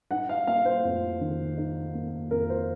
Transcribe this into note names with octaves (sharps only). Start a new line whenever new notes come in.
D#4 F#5
F5
A#3 F5
C5
F2
D#3
D#4
A#3
F2 A#4
C5